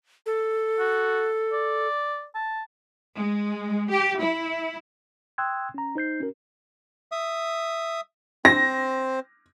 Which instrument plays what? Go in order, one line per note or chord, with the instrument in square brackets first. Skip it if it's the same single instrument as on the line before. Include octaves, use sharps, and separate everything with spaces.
[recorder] A4
[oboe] F#4
D5
A5
[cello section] G#3
G4
E4
[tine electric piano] G5 C6 D#6 E6 F#6 G#6
C#4 A#5
D#4 C5 G6 C7
C#4 F#4 A#4
[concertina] E5 D#6
[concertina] C4 C5 [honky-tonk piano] A#6